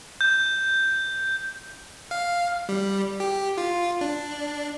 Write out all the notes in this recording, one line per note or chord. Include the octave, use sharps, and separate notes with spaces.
G6
F5
G3
G4
F4
D4